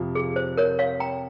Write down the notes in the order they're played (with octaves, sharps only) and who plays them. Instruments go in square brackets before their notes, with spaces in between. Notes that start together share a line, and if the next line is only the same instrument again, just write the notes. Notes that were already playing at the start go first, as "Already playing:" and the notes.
Already playing: [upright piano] F2 C3 F3
[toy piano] G#4
C5
A#4 C#5
C#5 F5
G5 A#5